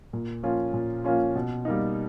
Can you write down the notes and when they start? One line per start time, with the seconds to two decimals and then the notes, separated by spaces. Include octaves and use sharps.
0.13 A#2
0.43 F3 A#3 C#4 F4
0.74 A#2
1.05 F3 A#3 C#4 F4
1.35 B2
1.65 G3 A#3 D#4